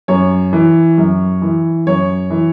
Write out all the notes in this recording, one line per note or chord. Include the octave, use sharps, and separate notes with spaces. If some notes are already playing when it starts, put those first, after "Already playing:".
F#2 C#5
E3
F#2
E3
F#2 C#5
E3